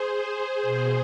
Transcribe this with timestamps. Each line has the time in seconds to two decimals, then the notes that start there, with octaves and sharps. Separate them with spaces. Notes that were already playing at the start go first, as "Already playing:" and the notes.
Already playing: G#4 C5
0.62 B2